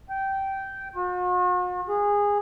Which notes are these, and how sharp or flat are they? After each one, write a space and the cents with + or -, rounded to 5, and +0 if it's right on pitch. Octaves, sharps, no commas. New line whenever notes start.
G5 -15
F#4 -45
G#4 -20